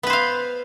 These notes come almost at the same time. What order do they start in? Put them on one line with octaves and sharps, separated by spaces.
B3 B4 C5 F5